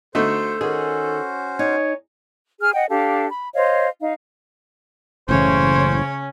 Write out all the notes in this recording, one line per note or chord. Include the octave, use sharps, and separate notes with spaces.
D3 A3 D#4 F#4 A4 C5
D#3 C#4 F#4 G#4 C5
D#4 C#5 G#5
G#4 F6
D#5 F#5 G5
D4 G4 A4 F5
B5
C5 C#5 D#5 F5
D#4 F5
F#1 A2 C#3 E3 C#4 C5 C#5